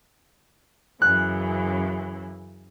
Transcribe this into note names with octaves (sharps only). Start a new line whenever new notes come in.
F#2 C#3 E3 F#6